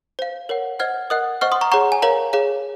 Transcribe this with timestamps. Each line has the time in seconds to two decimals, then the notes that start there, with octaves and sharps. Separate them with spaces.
0.19 C5 F5
0.49 A#4 C#5 F#5
0.79 C5 D#5 F#5 F6 G#6
1.10 A#4 D#5 F#5 D#6 F#6
1.41 C5 D#5 F#5 C#6 F6
1.52 C6 D#6
1.61 A#5 C#6
1.72 G#4 C#5 F#5 A#5 C#6
1.92 G#5
2.02 A#4 C#5 F5 A#5
2.33 G#4 C#5 F5